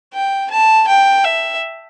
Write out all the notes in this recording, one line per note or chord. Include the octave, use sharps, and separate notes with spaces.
G5
A5
G5
E5